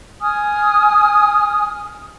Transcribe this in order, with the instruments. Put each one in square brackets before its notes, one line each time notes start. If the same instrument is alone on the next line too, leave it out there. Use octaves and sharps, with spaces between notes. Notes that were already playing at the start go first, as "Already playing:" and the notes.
[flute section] G#5 D#6 F6